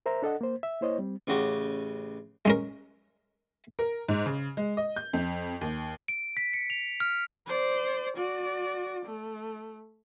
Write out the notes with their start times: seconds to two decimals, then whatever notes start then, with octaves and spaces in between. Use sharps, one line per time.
0.06 A#4 C5 E5 A#5
0.22 D4 A4 D#5 F#5
0.41 A#3 C5
0.63 E5
0.81 A#3 E4 C5 C#5 D#5
0.98 G3 C4
1.27 A1 C#3 F#4 G4
2.45 G#3 C#4 A#4
3.79 A#4
4.08 G#2
4.26 C#3
4.57 G#3
4.77 D#5
4.96 G6
5.13 F2
5.61 D#2
6.08 D7
6.37 B6
6.53 C#7
6.70 F7
7.00 F6
7.47 C5 D5
8.17 F#4 D5
9.06 A3